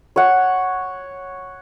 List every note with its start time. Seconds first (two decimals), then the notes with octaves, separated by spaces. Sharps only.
0.16 C#5 F#5